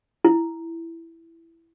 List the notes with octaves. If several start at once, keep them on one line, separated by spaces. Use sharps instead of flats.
E4